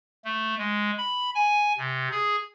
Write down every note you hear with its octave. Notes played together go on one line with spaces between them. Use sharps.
A3
G#3
B5
G#5
C3
G#4